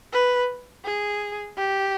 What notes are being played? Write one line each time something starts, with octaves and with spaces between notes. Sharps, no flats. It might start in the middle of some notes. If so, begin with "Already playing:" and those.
B4
G#4
G4